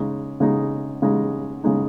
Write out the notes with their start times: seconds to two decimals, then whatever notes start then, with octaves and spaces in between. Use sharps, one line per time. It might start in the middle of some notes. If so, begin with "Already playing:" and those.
Already playing: C#3 G#3 D#4
0.40 C#3 G#3 D#4
1.02 C#3 G#3 D#4
1.64 C#3 G#3 D#4